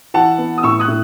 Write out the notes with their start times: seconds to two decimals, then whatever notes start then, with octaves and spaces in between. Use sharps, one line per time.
0.14 E3 F#5 A5
0.38 B3
0.58 D#6
0.63 A2 C#6 E6
0.79 D#6 F#6
0.88 A2